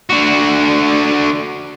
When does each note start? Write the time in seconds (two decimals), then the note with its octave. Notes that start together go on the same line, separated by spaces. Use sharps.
0.10 D3 F#4